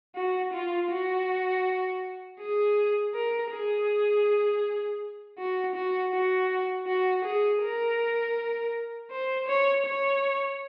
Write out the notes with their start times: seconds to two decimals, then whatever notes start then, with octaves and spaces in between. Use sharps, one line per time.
0.16 F#4
0.53 F4
0.90 F#4
2.40 G#4
3.14 A#4
3.51 G#4
5.38 F#4
5.75 F#4
6.13 F#4
6.87 F#4
7.25 G#4
7.62 A#4
9.11 C5
9.48 C#5
9.86 C#5